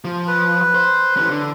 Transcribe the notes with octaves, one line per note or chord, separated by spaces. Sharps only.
F3
B4
C5
E3 C#4
D3